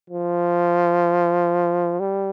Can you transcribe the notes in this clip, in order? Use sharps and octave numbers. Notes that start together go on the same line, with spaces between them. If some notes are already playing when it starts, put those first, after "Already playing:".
F3
G3